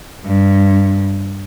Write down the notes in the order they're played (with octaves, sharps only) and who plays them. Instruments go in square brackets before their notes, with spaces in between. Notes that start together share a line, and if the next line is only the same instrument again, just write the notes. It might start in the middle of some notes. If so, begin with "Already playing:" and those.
[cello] G2